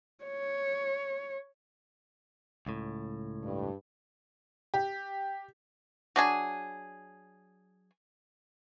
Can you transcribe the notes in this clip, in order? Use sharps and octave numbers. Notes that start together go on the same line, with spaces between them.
C#5
C#2 A2
G2
G4
F#3 D4 G#4